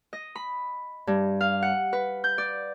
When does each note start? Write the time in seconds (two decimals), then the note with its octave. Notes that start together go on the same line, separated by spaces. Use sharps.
0.13 D#5
0.36 B5
1.07 G2
1.41 F5
1.62 F#5
1.93 B4
2.24 G6
2.38 D5